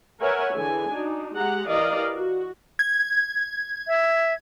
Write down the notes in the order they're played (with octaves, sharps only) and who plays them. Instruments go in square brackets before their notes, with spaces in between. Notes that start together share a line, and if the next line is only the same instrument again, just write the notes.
[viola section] A#4 B4 C#5 E5 F#5 G#5
D3 E3 G#4 G#5
D4 D#4 F#4
G#3 G4 G#4 F#5 A#5
E3 G4 A#4 D5 D#5 F5
F#4
[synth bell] G#6
[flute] E5